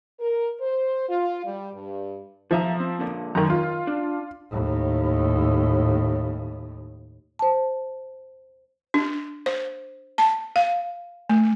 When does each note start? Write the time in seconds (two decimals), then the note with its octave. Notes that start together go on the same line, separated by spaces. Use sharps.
0.20 A#4
0.60 C5
1.08 F4
1.45 G3
1.74 G2
2.51 B1 F3 E5 A#5
2.80 C4
3.00 F2 A#2 D3
3.35 F#2 D#3 A#5
3.50 D#3 F4
3.87 D4
4.50 D#2 A2
7.39 C5 A5
8.94 D4
9.46 C5
10.18 A5
10.56 F5
11.29 A3